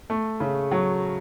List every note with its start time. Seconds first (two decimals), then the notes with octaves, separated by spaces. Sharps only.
0.10 A3
0.40 C#3
0.72 F#3